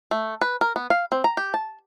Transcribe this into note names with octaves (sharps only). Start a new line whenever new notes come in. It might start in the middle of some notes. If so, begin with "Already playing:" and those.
A3
B4
A#4
B3
F5
C4
A#5
G4
A5